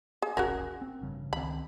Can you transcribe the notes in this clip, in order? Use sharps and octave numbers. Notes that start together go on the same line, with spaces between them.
G#4
E1 A#1 C#4 F#4 G#4 A#4
C4
A1 G2 C#3
C#2 D#3 C4 B5